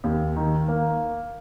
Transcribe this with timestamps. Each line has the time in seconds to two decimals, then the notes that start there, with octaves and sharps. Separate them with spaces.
0.04 D#2
0.36 D#3
0.68 A#3